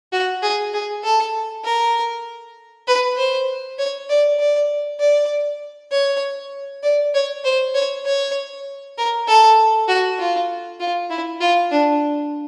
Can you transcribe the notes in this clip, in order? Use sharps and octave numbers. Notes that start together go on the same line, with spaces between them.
F#4
G#4
G#4
A4
A#4
B4
C5
C#5
D5
D5
D5
C#5
D5
C#5
C5
C#5
C#5
A#4
A4
F#4
F4
F4
E4
F4
D4